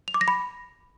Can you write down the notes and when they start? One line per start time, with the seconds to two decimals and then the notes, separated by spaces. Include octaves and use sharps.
0.08 F7
0.14 D6
0.21 A#6
0.28 B5